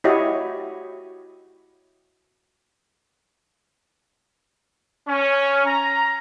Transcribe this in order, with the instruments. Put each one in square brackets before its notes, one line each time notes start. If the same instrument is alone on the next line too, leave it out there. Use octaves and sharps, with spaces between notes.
[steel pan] E4 F#4 G4 C#5 D#5
[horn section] C#4
A#5